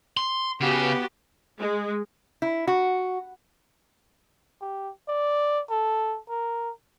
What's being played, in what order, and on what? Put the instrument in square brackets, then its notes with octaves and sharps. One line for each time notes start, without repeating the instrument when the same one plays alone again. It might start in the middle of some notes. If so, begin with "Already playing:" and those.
[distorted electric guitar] C6
[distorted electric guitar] C#3 [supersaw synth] B3 F#4 B4 [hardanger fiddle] G4
[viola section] G#3
[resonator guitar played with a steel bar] E4
F#4
[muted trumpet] G4
D5
A4
A#4